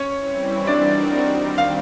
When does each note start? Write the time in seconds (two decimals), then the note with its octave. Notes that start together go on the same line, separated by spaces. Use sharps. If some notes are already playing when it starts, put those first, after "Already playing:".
Already playing: C#4 C#5
0.17 E3 G3 C4 E4
0.67 G3 C4 D4 D#4 F#4 A#4 D5
1.19 D#3 G3 C4
1.58 F5